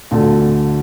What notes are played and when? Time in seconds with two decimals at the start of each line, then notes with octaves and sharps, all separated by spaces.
0.11 D2 D3 A3